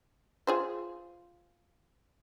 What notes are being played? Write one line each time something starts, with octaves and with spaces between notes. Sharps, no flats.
F4 G#4 C5